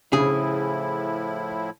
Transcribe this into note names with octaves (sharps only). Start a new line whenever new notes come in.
A2 C#3 F3 E4 G#4